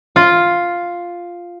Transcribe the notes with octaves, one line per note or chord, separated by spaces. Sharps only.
F4